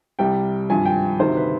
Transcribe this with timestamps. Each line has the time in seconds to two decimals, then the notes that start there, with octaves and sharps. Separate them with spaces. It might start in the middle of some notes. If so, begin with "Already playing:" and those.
0.19 C2 C3 G3 G5
0.70 G#1 G2 F3 G#5
0.86 G5
1.19 D2 C3 D#3 C5
1.37 B4